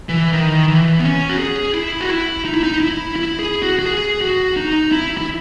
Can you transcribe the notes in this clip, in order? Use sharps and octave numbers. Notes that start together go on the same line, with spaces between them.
E3
D#3
E3
B3
C#4
F#4
G#4
E4
F#4
E4
D#4
E4
D#4
E4
E4
G#4
F#4
F#4
G#4
F#4
D#4
E4
E4